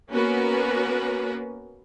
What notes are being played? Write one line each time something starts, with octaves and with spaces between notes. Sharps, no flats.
A#3 B3 C#4 F#4 A#4 B4